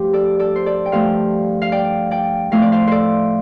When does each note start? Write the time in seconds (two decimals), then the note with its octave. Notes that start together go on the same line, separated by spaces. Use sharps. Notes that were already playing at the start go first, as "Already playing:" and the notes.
Already playing: G2 F3 A3 G4 C5
0.13 A4 D5
0.39 A4 D5
0.56 C5
0.66 A4 D5
0.86 G5
0.92 G2 F3 A3 C5 F5
1.62 F5
1.72 D5 G5
2.11 D5 G5
2.51 A2 F3 A3 F5
2.62 D5
2.72 C5 F5
2.88 A4 C5 D5